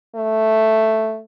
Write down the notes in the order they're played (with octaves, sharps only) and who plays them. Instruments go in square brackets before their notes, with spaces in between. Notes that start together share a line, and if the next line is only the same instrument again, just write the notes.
[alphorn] A3